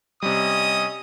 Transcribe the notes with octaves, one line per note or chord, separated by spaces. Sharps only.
C3 G3 C#4 D#5 D#6